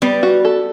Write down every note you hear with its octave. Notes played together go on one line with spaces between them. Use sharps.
G3 B3
F#4
A4